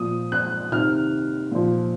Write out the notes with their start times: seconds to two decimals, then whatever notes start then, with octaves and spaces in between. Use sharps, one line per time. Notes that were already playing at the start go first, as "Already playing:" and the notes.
Already playing: A#2 F3 D#6
0.32 F#6
0.72 C3 D#3 F6
1.52 A#2 F3